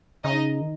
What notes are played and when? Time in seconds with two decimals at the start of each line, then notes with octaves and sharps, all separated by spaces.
0.23 C#3 D#4 D#5
0.61 D#3